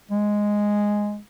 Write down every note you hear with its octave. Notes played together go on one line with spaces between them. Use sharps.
G#3